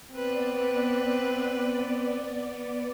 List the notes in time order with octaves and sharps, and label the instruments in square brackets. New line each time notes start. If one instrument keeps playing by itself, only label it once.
[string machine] B3 D5 [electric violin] C4 B4